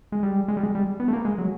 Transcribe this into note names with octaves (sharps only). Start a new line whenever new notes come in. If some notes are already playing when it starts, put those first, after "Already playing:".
G#3
G3
G#3
G3
G#3
G3
B3
A3
A#3
G#3
F#3